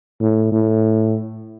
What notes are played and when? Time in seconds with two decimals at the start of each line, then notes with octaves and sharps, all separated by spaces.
0.21 A2
0.52 A2